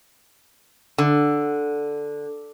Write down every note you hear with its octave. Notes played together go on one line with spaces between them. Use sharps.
D3